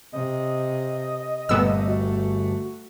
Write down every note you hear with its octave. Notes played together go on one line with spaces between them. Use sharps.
C3 D#5
G1 A#2 G3 A3 B3 E6
F#4